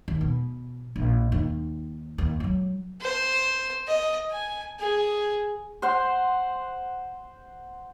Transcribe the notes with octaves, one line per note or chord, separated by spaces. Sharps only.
D#2
B2
A#1
D#2 D#4
D#2
F3 F#3
C5
D#5
G#5
G#4
C5 F#5 C6